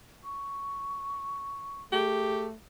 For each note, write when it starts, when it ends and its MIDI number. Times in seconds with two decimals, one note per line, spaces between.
0.24 1.82 85
1.93 2.54 57
1.93 2.47 67
1.93 2.45 68